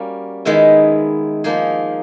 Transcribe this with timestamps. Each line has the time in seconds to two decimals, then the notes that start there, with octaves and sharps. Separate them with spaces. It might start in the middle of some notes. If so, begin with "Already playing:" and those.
Already playing: G3 A#3 C#4 F#4
0.45 D#3 G#3 B3 E4
1.44 F3 A#3 D#4 G#4